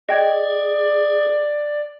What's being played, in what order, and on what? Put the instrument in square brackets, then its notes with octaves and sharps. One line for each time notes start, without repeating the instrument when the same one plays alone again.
[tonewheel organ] G#4 [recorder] D5 [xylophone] D#5 G5 G#6